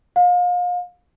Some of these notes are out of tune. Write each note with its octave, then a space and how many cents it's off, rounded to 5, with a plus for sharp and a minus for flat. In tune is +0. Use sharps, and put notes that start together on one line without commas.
F5 +35